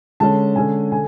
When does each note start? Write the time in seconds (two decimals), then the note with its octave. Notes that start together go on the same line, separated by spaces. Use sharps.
0.20 D3 G#3 C#4 A5
0.56 D3 G#3 C#4 G#5
0.92 D3 G#5